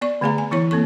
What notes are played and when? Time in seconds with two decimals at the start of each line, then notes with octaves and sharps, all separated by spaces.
0.01 B3 D5 C#6
0.21 D3 A3 B3 G#4 F5 A#5
0.38 G#5
0.51 E3 B3 E4 C#5 C#6
0.71 A#3 C4 A4 C#6